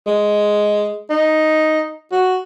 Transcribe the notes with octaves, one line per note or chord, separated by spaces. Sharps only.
G#3
D#4
F#4